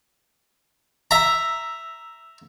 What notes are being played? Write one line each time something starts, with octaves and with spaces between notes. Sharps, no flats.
E5 A#5